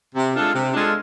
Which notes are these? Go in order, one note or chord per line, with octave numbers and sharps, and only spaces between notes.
C3
G#3 D4 F4 A4
C3
G#3 D4 F4 A4